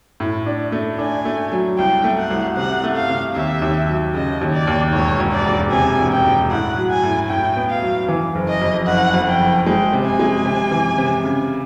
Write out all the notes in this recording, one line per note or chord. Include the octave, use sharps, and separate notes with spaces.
A2
D4
A3
D4 G#5
A3
F#3
C2 G5
A3
F#5
C2
C3 F#5
A3
F5
C3
D#2 E5
D#2
F#3
C#3 D#5
D#2
D5
D#2
E1 C#5
E1
D5
E1
C3 G#5
E1
G5
E1
A2 F#5
F#3
G#5
A2
A2 G5
B3
F5
F#3
E3
F#1
D#5
F2
F#1 F#5
F2
G5
F#1
G#3 G5
C3
G#5
G#3
C3
E3
C3
C#3